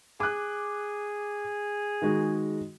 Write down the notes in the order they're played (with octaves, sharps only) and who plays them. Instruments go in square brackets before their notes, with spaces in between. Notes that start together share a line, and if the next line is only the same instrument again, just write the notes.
[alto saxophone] G#4 [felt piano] D6 F#6
[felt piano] D#3 G#3 F#4